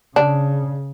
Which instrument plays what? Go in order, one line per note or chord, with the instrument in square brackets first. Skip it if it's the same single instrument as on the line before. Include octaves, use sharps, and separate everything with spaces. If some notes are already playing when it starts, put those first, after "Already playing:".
[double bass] C#3 [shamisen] D4